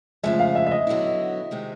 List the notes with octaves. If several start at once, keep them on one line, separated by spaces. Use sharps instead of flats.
D2 C#3 F3 G#3 E5
F5
E5
E5
D#5
D3 F#3 B3 E4
C3 D#3 G#3 C4